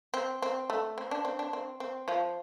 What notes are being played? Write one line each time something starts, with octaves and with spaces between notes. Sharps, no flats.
C4
C4
A3
C4
D4
C4
D4
C4
C4
F3 F4